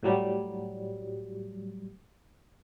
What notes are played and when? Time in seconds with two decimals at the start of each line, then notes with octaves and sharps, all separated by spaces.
0.03 A2 F#3 G3